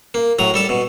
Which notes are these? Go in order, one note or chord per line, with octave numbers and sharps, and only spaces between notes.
A#3
A2 F#3 A#5
G3 A4 A5
B2